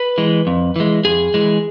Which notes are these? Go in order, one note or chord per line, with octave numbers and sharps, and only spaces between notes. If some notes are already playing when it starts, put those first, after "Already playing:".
Already playing: B4
E3 G#3
F2
E3 G#3
F2 G#4
E3 G#3